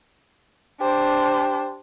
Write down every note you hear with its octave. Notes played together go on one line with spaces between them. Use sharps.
D4 G4 C5